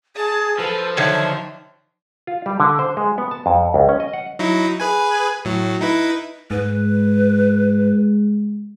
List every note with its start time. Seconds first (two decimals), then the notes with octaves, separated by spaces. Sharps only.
0.16 G#4 A5
0.59 F3 A4 B4
0.97 D3 D#3 F#3 D4 C#5 E5
2.27 F4
2.46 G3
2.60 D3
2.79 C5
2.97 G#3
3.18 B3
3.31 A5
3.46 F2
3.74 C#2
3.89 C#4
4.00 D#5
4.13 F#5
4.39 F#3 D#4 E4
4.80 G#4 B4 G#5
5.45 A2 F#3
5.81 D#4 E4 B4
6.51 G#2 G#3 B4